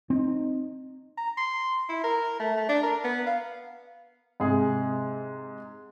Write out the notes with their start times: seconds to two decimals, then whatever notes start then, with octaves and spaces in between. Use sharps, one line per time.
0.10 C4 D#4
1.18 A#5
1.37 C6
1.89 E4
2.04 A#4
2.40 A3
2.57 A3
2.69 D4
2.83 A#4
3.04 B3
3.27 F5
4.40 G#2 C3 G#4